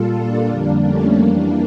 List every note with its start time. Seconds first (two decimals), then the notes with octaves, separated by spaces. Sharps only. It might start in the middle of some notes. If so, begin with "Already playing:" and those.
Already playing: A#2 G3 F4 A4
0.12 A#3 D4
0.47 F2 D3 G3 A#3 D4
0.82 A3 C#4
1.18 F2 E3 G3 A#3 D4